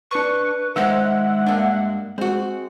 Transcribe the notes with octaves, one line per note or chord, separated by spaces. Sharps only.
D4 B4 C#6
D#3 G#3 C#4 C5 E5 F#5
G2 A#3 D4
G#3 C4 F#4